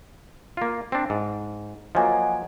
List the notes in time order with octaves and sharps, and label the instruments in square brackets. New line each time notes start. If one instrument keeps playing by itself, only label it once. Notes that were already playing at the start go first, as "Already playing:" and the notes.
[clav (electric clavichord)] A#3 F4
C4 D4
G#2
[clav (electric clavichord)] F3 F#3 A#3 [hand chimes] D#5 F#5 G#5